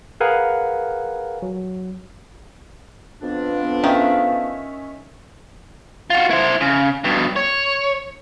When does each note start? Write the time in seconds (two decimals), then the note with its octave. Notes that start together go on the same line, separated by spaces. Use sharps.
0.20 G#4 A#4 B4 F5 F#5 G#5
1.42 F#3
3.22 F2 B3 D4 F4
3.84 D#3 C#4 E5
6.10 F4 F#4
6.31 E4 C5
6.61 C#3
7.04 G2 B2
7.36 C#5